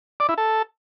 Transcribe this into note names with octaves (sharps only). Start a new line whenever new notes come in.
D5
E4
A4